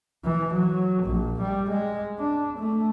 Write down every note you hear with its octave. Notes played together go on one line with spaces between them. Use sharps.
E3
F#3
A#1
G3
G#3
D4
A3